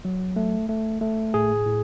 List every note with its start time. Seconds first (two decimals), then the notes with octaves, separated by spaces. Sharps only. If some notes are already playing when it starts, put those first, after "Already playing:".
0.05 F#3
0.36 A3
0.69 A3
1.01 A3
1.34 A2 G#4
1.66 A2